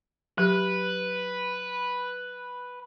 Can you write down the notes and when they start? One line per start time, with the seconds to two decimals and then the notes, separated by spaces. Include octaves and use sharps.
0.38 F#3 G4 B4